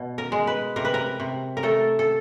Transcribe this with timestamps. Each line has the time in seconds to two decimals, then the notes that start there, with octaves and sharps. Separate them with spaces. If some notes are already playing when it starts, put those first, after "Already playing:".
Already playing: B2
0.18 A#4
0.32 G#3
0.47 B4
0.76 C3 A#4
0.85 B4
0.94 A#4
1.20 C3
1.57 A#4
1.63 A3 A4
1.99 A4